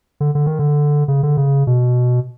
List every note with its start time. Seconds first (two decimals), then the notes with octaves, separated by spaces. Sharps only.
0.20 D3
0.35 D3
0.46 D#3
0.59 D3
1.08 C#3
1.23 D3
1.37 C#3
1.67 B2